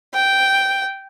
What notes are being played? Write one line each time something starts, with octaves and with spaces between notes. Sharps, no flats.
G5